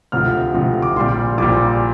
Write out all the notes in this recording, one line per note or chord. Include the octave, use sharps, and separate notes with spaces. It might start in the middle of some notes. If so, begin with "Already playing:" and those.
D2 C3 F3 F6
D2 C3 F3
D6
A#1 A#2 G3 C6
A#1 A#2 G3 D6